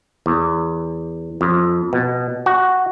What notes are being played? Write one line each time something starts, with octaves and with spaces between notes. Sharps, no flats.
E2
F2
B2
F#4